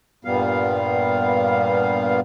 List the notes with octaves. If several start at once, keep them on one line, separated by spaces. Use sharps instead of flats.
G2 A#2 G3 B3 F5